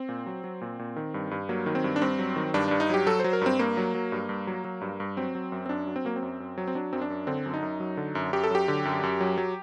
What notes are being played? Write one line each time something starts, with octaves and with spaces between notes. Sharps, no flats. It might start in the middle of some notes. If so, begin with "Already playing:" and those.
Already playing: C4
A#2
F#3
F#3
A#2
A#2
D#3
G2
G2
F#3 A#3
D#3
C4
G2
D4
G2 C4
F#3
D#3
G2 D4
G2 D4
D#4
F#3 G4
F#3 A4
F#3 C5
A#4
G2 C4
G2 A#3
F#3
F#3
G2
G2
F#3
F#3
G2
G2
F#3 C4
F#3
F#2
C4
F#2 D4
F#3
C4
F#3 A#3
C4
F#2
F#2
F#3
C4
F#3 D4
F#2 C4
D4
F#2
D3 C4
F#2
D#4
F#2
F#3
D3
F#2
F#2 G4
A4
F#3 G4
D3
F#2
F#2
F#3
F#3